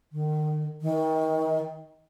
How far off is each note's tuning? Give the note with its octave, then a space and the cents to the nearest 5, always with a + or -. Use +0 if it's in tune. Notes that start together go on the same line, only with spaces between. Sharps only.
D#3 -35
D#3 +30